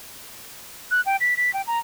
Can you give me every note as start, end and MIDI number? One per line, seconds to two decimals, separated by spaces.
0.91 1.01 90
1.06 1.17 79
1.20 1.34 95
1.37 1.53 95
1.54 1.62 79
1.67 1.79 82